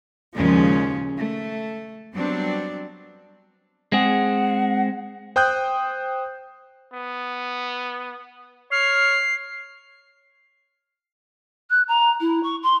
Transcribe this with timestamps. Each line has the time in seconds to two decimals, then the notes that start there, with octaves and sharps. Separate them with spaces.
0.36 D#2 A#2 C#3 F3 G#3 C#4
1.17 A3
2.14 F#3 G3 B3 C4 D4
3.92 G#3 C4 G#4 F#5
5.36 C5 G5 D#6 F#6 G6
6.94 B3
8.72 C#5 F6 C7
11.70 F#6
11.88 A#5
12.20 E4
12.43 C#6
12.63 C6